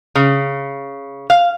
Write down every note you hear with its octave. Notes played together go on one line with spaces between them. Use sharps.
C#3
F5